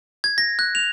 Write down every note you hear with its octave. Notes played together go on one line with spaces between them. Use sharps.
G#6
A#6
F#6
F7